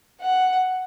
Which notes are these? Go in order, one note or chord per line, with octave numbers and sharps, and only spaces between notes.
F#5